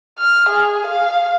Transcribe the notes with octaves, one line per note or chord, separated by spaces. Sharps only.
F6
G#4
F5